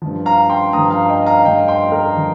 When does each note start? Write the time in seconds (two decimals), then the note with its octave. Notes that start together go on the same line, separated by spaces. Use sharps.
0.02 G2 F3
0.26 F5 A#5
0.49 G5 C6
0.73 G2 F3 A#5 D#6
0.91 F5 A#5
1.09 D#5 G5
1.26 F5 A#5
1.45 G2 F3 D#5 G5
1.68 G5 C6
1.92 A#4
2.17 F3